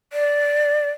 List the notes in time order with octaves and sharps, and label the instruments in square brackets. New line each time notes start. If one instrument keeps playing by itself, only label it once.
[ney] D5